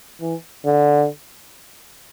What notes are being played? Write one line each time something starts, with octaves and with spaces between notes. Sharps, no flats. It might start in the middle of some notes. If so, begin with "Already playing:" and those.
E3
D3